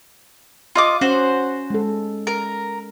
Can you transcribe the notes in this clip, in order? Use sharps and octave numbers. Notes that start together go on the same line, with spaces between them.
F4 D#5 D6
C#4 F#4 C5
G#3 A4
A#4